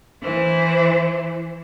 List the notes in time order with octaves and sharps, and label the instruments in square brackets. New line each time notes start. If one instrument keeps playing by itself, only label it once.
[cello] E3 C5